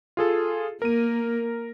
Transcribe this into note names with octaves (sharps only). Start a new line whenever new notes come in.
F4 G#4 A4
A#3 A#4 D#7